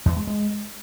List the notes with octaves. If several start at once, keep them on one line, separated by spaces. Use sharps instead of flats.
E2
G#3
G#3